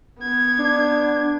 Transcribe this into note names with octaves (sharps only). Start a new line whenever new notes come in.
B3 G#6
D4